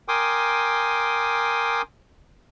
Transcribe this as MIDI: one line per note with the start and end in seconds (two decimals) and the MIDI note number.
0.08 1.82 70
0.08 1.82 79
0.08 1.82 80
0.08 1.82 84
0.08 1.82 86
0.08 1.82 87